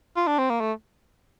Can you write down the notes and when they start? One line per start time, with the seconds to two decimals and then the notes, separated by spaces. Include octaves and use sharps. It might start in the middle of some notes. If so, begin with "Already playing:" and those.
0.17 F4
0.27 D4
0.39 C4
0.50 A#3
0.61 A3